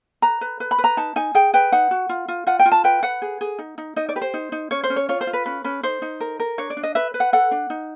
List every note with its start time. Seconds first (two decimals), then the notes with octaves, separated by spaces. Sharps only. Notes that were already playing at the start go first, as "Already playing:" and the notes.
0.22 B4 A#5
0.41 B4
0.60 B4
0.71 B5
0.78 B4
0.84 A#5
0.97 D#4 A5
1.16 D#4 G#5
1.35 G#4 G5
1.54 B4 G5
1.72 D#4 F#5
1.91 F#4
2.09 F4
2.28 F4
2.47 F4 F#5
2.59 G5
2.66 F4
2.72 A5
2.84 B4 G5
3.03 B4 F#5
3.22 G#4
3.41 G#4
3.59 D#4
3.78 D#4
3.96 D#4 D#5
4.09 D5
4.16 G4 B4
4.21 C5
4.34 D#4
4.52 D#4
4.71 C#4 C#5
4.83 C5
4.90 C#4
4.96 C#5
5.09 F4 C#5
5.21 C5
5.27 F4
5.33 B4
5.46 C#4 B4
5.64 C#4 B4
5.83 D#4 C5
6.02 D#4
6.20 A#4
6.40 A#4
6.58 D4 C#5
6.70 D5
6.77 D4
6.83 D#5
6.95 B4 E5
7.14 B4
7.20 F#5
7.33 A4 F#5
7.51 D4
7.70 D#4